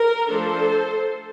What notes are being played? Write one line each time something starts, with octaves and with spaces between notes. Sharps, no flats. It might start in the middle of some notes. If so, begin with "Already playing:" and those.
Already playing: A#4
F3 A3 D4 A4 C5